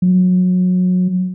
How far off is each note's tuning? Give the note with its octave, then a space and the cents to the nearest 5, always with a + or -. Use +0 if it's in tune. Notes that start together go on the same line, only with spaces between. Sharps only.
F#3 -25